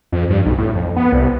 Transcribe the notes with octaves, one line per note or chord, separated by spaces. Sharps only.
F2
G2
B1
A2
F2
B3
C2